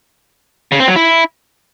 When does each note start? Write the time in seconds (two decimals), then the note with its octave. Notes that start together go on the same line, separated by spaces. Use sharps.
0.72 C#3
0.80 C4
0.88 F#3
0.96 E4